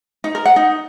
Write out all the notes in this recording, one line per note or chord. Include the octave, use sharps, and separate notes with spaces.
D#4
A#4
F#5
D#4